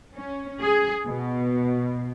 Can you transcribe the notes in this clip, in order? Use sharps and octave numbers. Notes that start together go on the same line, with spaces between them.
C#4
G#4
B2